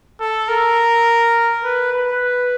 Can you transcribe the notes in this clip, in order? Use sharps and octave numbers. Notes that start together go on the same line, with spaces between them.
A4
A#4
B4
B4